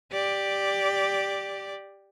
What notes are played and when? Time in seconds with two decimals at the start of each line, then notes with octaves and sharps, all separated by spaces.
0.12 G4 D5